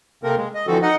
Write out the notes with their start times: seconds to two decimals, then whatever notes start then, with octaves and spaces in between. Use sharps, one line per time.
0.23 C3 A3 A#3 C4 A#4
0.37 G#3
0.54 D#5
0.67 D3 E3 F3 C4 F#4 A4
0.82 D#4 D#5 F#5